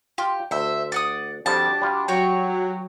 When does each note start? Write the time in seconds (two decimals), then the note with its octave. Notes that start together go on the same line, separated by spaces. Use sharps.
0.18 F4 G4
0.51 D2 C5 E5
0.92 D5 F#5 D#6
1.46 F2 F3 G3 D4 F#4 G4 A5
1.82 G3 F4
2.08 F#3 F#4 C#5 G5